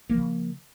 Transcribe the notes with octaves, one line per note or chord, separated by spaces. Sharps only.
C#3 F3 A#3